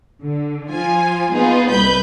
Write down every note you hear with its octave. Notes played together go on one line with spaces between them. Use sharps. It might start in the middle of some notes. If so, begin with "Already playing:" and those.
D3
F3 F4 G#5
B3 D#4 F4 G#4 B4
C2 B4 B5 G6